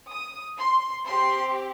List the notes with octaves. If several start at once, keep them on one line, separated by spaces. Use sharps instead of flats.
D#6
C6
C4 G4 C6